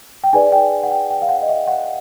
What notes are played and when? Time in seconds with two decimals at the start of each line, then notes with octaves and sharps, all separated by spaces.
0.24 G5
0.33 D#4 G#4 B4 D5 G#5
0.52 G5
0.83 F#5
0.92 G5
1.10 G5
1.22 F5
1.29 F#5
1.42 D#5
1.49 E5
1.67 F#5